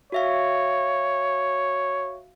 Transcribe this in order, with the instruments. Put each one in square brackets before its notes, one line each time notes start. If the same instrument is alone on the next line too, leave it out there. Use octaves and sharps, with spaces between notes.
[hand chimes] F#4 E5 F5 [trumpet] C#5